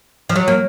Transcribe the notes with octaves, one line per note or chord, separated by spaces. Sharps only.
F3
F#3
A#3